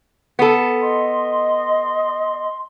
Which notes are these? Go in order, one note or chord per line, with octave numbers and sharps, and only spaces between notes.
B3 A4
D#5 C6